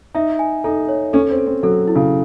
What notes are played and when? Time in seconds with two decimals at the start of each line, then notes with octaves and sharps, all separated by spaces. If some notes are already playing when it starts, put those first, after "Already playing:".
0.14 D#4 E5
0.39 G#5
0.64 D#4 A4
0.89 C#5
1.13 C#4 A4
1.30 C4
1.38 A4
1.47 C4
1.63 F#3 A4
1.88 E4
1.95 C#3